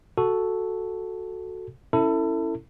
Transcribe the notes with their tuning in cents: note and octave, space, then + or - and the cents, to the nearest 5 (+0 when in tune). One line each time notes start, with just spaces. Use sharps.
F#4 +0 A4 +0
C#4 +0 E4 +0 A4 +30